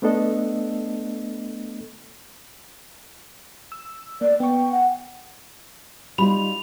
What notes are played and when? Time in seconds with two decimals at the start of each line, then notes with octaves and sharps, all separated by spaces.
0.02 A3 B3 D4 A4 D#5
3.72 E6
4.21 A#3 D5
4.40 B3 G5 C#6
4.72 F#5
6.18 G3 D#4 F4 B5 F7